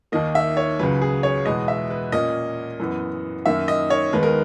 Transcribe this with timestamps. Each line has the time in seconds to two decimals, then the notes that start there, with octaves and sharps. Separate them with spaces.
0.12 D#2 D#3 A#3 D#5
0.35 E5
0.57 C#5
0.79 C#2 C#3 F#3 B4
1.02 G#4
1.23 C#5
1.45 E2 B2 G#3 B3 D#5
1.68 E5
1.90 B4
2.12 A#2 A#3 C#4 D#5
2.80 F#2 E3 B3
3.46 F#2 D#3 A#3 E5
3.68 D#5
3.90 C#5
4.13 D#2 D#3 G#3 B3 B4
4.23 A#4